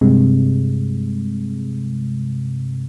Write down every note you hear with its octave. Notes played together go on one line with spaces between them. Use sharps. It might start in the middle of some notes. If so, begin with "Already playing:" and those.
G2 C3 G#3